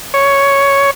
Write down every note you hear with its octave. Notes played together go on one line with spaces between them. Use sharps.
C#5